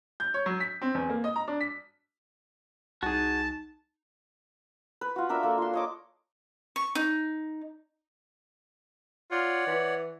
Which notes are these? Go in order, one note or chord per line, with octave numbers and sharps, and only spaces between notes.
G6
C#5
F#3
B6
C4
E2
A#3
D#5
A#5
D4
B6
C2 D#4 F#4 G#4 A5
B4
F4 F#4
D4 A#4 E5 B5
A#3 A4
F4 C6
C#5 D#5 D6
C#6
D#4
F4 C#5 D5 F#5
E3